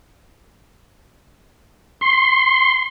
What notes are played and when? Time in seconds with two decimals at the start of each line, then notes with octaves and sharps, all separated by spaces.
2.01 C6